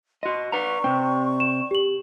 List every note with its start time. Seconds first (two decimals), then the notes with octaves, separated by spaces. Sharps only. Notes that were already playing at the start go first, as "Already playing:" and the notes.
0.23 F#4 D#5 C6
0.52 B4 D5 F#5 A#5 C#6
0.84 C3 C4 G5
1.40 E7
1.71 G4 F#7